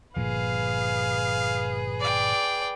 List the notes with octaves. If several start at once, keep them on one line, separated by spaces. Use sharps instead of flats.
G1 A#2 F3 G#4 B4 F5
D5 G5